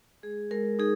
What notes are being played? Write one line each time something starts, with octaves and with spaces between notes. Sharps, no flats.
G#3 G#4
G#3 A#4
D#4 G#4